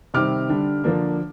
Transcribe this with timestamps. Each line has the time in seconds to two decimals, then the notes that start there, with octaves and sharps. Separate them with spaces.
0.14 C3 D#3 G3 C4 D6 F6
0.49 D3 G3 D4
0.84 D3 F3 A#3 D4